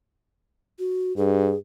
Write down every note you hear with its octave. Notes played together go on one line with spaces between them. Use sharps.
F#4
G2 G#4